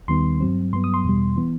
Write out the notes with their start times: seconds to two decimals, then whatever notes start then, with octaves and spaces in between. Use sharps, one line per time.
0.08 D#2 D#3 G3 B3 C6
0.40 G2 F#3 C4
0.73 G2 F#3 B3 C6
0.84 D#6
0.94 C6
1.04 E2 B2 G3
1.36 E3 B3